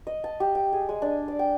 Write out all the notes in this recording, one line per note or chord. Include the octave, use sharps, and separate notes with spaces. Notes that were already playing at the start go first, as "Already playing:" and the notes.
D#5
A5
G4
G5
G#4
G#3
D4
D5
G5